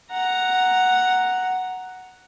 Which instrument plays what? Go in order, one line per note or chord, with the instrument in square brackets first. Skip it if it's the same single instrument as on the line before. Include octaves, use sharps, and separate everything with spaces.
[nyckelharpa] F#5 A#5